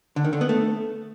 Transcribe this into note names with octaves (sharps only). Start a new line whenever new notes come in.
D3
D#3
D3
B3
A3